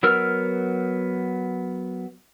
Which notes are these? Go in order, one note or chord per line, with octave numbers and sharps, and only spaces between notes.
F#3 B3 A#4 E6 F6